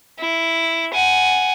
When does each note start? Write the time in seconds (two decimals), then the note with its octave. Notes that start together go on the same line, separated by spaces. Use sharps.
0.19 E4
0.93 F#5 G#5